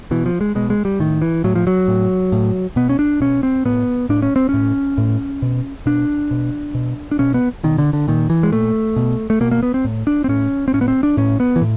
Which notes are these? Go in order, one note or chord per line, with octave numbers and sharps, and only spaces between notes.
B2 E3
F3
G#3
B2 G#3
G#3
G3
A2 D#3
E3
A2 F#3
F3
F#3
A2
A2
B2 B3
C#4
D4
B2 C#4
C4
A2 B3
A2 D4
C#4
C4
A2 C#4
A2
B2
B2 D4
B2
B2
D4
B2 C#4
B3
B2 D#3
D3
D3
A#2 D#3
E3
G#3
A#2 A3
B2
A3
B2 A#3
A#3
B3
C4
A2
D4
C4
A2 C#4
C4
A2 C#4
B3
C4
D4
A2 C#4
B3
E3
A2